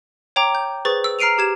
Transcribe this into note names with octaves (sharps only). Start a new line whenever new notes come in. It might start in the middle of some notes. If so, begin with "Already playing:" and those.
C#5 G5 A#5 D6
G6
G#4 B4 C5 C#6 A6
E6
A#5 F6 C7 D7 D#7 F7
G4 G#6 E7